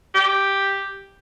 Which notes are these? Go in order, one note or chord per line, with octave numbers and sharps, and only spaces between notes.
G4